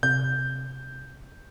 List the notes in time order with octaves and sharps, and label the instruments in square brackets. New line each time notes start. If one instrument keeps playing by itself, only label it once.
[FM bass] C3 [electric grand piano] G6